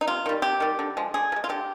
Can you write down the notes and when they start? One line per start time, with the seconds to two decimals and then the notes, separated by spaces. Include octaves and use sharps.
0.01 D#4
0.07 C3 F4
0.26 D#3 G3
0.42 C3 G4
0.60 D#3 G3
0.79 D3
0.97 F3 G#3
1.14 D3 G#4
1.32 F3
1.36 G#3
1.44 F4
1.49 D3 G4